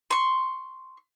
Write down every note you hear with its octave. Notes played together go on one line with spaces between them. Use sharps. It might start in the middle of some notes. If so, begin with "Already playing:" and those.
C6 C#6